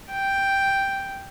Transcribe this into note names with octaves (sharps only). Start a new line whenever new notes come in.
G5